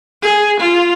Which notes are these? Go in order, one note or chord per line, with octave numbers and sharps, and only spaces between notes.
G#4
F4